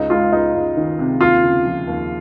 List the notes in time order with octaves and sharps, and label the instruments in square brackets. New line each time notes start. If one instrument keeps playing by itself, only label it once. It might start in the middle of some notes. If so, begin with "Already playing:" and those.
Already playing: [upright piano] C#2 [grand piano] D#4
[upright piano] G#3 [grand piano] F4
[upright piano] C#2 [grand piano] D#4
[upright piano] C#2
D#3
C3
[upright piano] D#2 [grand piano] F4
[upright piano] C#3
F3
D#2